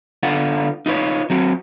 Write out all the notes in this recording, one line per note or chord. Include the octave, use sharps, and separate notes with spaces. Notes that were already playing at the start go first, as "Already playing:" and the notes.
D3 B3 F4 F#5
D#4 F4 B4 C#5
F#3 C4 F#4